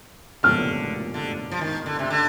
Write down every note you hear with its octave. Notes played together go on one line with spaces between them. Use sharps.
D3 F6
D3
F3
D#3
D3
C3
D3